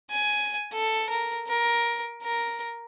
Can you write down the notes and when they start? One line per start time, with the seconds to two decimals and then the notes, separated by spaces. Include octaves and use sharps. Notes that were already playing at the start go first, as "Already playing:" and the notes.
0.11 G#5
0.73 A4
1.10 A#4
1.48 A#4
2.23 A#4